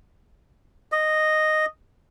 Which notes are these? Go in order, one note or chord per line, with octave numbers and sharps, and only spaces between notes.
D#5